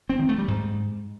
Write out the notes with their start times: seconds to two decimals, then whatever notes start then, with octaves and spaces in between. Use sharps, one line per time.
0.10 C4
0.19 D#3
0.29 A3
0.38 G3
0.48 G#2